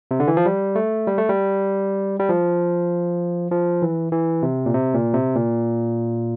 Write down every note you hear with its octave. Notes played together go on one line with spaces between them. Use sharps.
C3
D3
E3
F3
G3
A3
G3
A3
G3
G3
F3
F3
E3
E3
C3
A#2
C3
A#2
C3
A#2